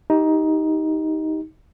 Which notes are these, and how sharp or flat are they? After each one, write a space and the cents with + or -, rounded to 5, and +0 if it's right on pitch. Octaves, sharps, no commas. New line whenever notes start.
D#4 +15 G4 -5